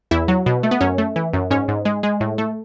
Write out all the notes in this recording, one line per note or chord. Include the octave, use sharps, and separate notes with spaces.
E2 E4
F#3
B2
A3
B3
F#2 C#4
A3
E3
F#2
G#2 C#4
G#2
G#3
G#3
A2
A3